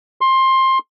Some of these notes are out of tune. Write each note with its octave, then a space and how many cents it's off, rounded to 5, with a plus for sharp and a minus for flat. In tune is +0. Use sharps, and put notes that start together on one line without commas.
C6 +20